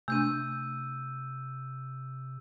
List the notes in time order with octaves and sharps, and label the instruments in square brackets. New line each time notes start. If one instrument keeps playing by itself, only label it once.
[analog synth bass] C3 [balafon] A3 D4 [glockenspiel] E6 G6 D#7